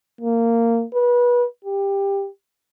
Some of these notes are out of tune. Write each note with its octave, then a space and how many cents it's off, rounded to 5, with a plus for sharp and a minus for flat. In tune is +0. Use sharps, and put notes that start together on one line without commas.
A#3 -15
B4 -25
G4 +15